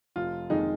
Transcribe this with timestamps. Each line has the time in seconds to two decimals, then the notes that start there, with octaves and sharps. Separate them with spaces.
0.16 F1 F4
0.50 F2 D#3 G#3 D#4